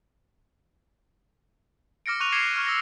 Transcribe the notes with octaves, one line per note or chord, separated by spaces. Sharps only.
D6 F6 A#6 C#7 D7
C#6 F#6 D#7 F7
D6 G#6 C7 C#7 E7 G7
C#6 F6 D7
E6 A#6